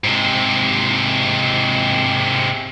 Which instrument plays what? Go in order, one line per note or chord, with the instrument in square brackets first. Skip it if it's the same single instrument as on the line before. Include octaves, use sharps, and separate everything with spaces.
[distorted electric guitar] G#2 C3